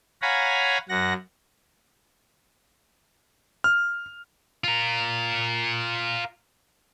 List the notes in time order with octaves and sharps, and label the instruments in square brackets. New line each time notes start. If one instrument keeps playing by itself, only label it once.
[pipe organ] C#5 F5 F#5 G#5 A#5 B5
F#2 F#5 A#6
[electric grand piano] F6
[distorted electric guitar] F4 A#4